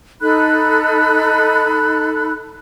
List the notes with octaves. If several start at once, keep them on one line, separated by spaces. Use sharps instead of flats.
D#4 A4 B5 F#6